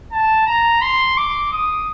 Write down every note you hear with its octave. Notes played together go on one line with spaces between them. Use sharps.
A5
A#5
C6
D6
D#6